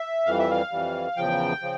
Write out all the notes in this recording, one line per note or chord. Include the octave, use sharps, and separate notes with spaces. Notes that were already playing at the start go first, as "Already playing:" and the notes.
Already playing: E5
F2 E3 G3 F5
E5
F5
F2 E3 G3
E2 C#3 F3 G5
C#3 F3